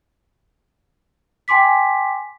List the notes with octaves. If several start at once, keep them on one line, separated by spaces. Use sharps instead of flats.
G5 G#5 C6 D6 B6